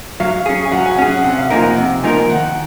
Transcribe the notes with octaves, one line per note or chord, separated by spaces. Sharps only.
F#3 F5
C#4 G#4
G#5
F#3 F#5
G#5
C#4 G#4 F#5
F#5
C3 F#5
F5
F3 A#3 D#4 A#4 G#5
F#5
C3
F3 A#3 D#4 A#4 G#5
D#3 F#5